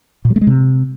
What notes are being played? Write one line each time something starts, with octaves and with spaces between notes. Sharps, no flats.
A#2
F#3
A3
G#3
C3